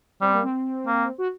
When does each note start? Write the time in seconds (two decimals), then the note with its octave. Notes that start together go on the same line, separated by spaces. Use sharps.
0.21 G3 C4
0.33 A#3
0.43 C4
0.86 A#3
1.18 F#4